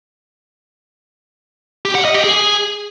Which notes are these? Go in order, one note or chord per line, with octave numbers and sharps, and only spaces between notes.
G4
F#5
D#5
G4
G#4